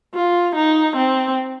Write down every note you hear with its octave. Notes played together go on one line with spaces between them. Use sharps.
F4
D#4
C4